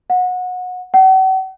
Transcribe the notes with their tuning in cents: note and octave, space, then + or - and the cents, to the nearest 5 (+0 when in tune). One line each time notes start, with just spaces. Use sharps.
F#5 -25
F#5 +45